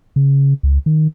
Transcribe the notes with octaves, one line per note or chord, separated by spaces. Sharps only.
C#3
C#2
D#3